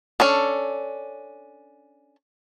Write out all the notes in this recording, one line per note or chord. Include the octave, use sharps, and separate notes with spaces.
C#4 D4 A4